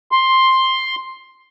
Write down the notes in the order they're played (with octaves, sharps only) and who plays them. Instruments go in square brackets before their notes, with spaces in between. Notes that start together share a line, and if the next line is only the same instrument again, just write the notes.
[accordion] C6